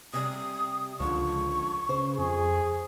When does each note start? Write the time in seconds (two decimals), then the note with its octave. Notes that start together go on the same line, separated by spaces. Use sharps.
0.13 C3 G3 D#6
1.00 C#2 D3 F3 C#6
1.89 C#3 C5
2.18 F2 G#4